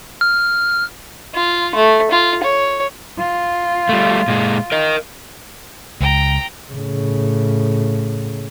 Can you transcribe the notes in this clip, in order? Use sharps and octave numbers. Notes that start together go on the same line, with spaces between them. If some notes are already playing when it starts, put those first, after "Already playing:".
F6
F4
A3
F4
C#5
F4
G3 A3
A#2 G#3
A#4 D#5
C#2 G5 A#5
A2 C#3